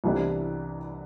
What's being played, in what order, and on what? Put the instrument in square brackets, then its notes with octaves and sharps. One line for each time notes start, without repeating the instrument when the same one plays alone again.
[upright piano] C2 C3 E3 B3 D4